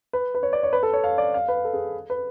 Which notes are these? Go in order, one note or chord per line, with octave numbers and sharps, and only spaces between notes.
B4
B4
C#5
D5
C#5
B4
A4
C#5
F5
D5
F5
B4
A4
G#4
B4